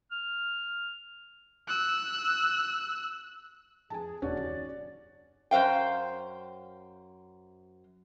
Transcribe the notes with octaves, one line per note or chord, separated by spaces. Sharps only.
F6
E6 F#6
F2 G#4 G#5 A5
D#1 C#4 F#4 D5
F#2 D#3
F#2 C5 F5 G5